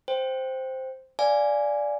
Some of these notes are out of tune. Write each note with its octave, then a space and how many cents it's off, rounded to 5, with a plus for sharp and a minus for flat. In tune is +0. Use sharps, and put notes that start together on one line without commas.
C5 +0 G5 +0
D5 -5 F5 -20 G#5 +0